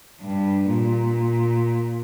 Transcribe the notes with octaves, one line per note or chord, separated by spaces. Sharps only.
G2
A#2